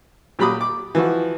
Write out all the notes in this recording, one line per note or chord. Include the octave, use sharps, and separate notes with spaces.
A#2 F#3 G4 B5 D6 D#6
D6
E3 F3 F#4